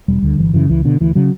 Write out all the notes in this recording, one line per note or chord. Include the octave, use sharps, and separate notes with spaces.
E1 G3
D2 D3
G1 E3
F#2 C#3 E3
C#2 E3
B2 D3
D2 E3
C#3 F#3